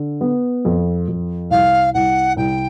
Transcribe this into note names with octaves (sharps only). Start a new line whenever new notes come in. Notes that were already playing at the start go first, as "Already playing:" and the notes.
Already playing: D3
B3
F2
F2
C2 F5
C2 F#5
C2 G5